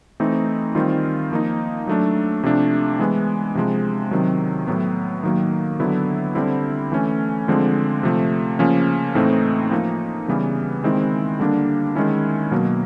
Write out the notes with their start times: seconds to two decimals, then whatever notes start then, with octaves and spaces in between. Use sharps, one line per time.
0.20 E3 A3 C4 D#4
0.75 D#3 G3 C4 F4
1.32 F3 A#3 D#4
1.87 F#3 A3 D4
2.43 C3 F3 A3 D4
2.99 E3 G#3 B3
3.55 C3 F3 G#3
4.11 C3 D#3 F#3
4.67 A2 F#3 B3
5.24 D#3 F#3 A#3
5.80 D3 F#3 B3 E4
6.35 D3 G3 C4 E4
6.92 E3 A3 C#4
7.48 D3 F3 G#3 C4
8.03 C3 F3 A3
8.59 C#3 F3 A#3 C#4
9.15 A2 E3 A3 C4 D#4
9.71 F3 A#3 D#4
10.28 C#3 E3 G3 B3
10.84 D#3 G#3 C4 E4
11.40 D3 G3 A#3 D4
11.95 D#3 G#3 C#4 E4
12.51 B2 F#3 A#3